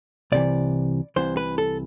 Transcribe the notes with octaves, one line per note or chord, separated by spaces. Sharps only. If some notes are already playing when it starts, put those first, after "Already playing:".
C2 C3 E3 D5
C2 C3 E3 C5
B4
A4